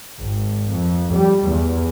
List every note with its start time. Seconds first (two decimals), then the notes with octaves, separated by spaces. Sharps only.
0.20 G#1
0.71 F2
1.12 G3
1.48 E2